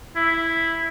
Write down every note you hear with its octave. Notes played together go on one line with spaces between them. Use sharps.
E4